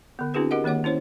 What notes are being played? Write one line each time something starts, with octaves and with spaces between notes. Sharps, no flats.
D3 B3
C4 D4 E4 F#4 G#4 B4
G4 A#4 D#5 F#5
D#3 A#3 C#5 F#5 D6
C#4 E4 C5 C#5